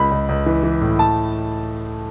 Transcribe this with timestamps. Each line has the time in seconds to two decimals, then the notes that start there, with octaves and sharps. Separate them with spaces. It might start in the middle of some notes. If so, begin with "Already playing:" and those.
Already playing: C#2 B5
0.11 C#2
0.29 C#2
0.46 E3
0.63 E3
0.81 A2
0.99 A5